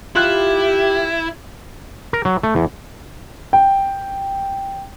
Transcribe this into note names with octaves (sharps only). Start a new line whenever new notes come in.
E4 F4 G4 F#6
A#4
F#3
A3
E2
G5